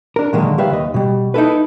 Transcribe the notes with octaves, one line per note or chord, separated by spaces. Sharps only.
D4 A#4
A#2 D3 D#3 F#3 G#3 A#3
C#3 G3 B4 E5 F5
D#2 D#5
B2 G3
D#4 E4 A4 B4